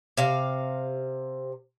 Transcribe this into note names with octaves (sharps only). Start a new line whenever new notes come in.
C3 F5